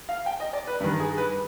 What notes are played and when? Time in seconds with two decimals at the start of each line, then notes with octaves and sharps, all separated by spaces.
0.09 F5
0.26 G5
0.40 D#5
0.53 D5
0.67 B4
0.80 G2 B4
0.84 D#3
1.00 G#4
1.18 B4